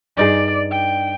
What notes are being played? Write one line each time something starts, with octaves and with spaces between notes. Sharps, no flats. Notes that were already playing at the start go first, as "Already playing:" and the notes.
G2 D#4 G#4 D5
G5